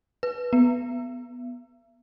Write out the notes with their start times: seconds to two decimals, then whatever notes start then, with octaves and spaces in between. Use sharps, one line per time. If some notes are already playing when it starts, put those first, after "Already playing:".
0.23 B4
0.53 B3